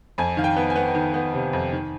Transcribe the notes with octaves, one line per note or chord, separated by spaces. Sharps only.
F2 G#5
D#3 F5
G5
B3
G#5
B3
D#3
B3
C3
F2
D#3